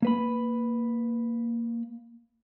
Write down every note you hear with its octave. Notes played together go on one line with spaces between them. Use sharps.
A#3 B4 B5